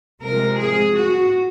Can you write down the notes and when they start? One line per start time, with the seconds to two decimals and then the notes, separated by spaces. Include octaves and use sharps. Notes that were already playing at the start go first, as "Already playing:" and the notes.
0.23 C3 F3 G#3 A#4
0.60 G#4
0.96 F#4